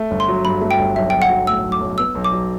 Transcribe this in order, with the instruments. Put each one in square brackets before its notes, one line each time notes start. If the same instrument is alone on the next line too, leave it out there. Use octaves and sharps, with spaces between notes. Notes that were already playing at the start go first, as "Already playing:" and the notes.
Already playing: [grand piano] A3
G1
[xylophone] C6
[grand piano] F#3
[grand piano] G2 [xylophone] B5
[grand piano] A3
[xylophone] G5
[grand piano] G1
[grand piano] B1 [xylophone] E5
[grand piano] B1 [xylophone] G5
[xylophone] F#5
[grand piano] F#3
[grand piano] A2 [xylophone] E6
[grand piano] B1
[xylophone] D6
[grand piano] B1
[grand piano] B3 [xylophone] E6
[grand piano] B1
[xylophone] D6
[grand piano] F#3